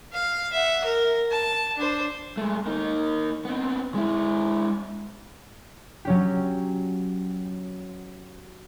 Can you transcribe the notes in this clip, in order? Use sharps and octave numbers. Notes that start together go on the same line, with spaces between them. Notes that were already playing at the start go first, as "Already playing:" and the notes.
F5
E5 F#5
A#4
A5
D4 C5
G#3 A3
A#3 D#4
B3 C4
G#3 E4
F#3 C#4 G4